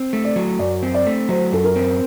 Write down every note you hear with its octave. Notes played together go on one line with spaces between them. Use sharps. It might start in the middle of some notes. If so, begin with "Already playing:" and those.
Already playing: C4
A3
D5
F#3
F#2 D5
C4
D5
A3
F#3 C5
F#2 A4
A#4
C4